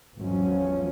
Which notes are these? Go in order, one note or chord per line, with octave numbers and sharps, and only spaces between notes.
G#1 E2 F3 F#3 C#4